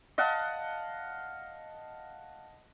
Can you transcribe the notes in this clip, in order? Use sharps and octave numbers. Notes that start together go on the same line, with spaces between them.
D#5 F5 F#5 A5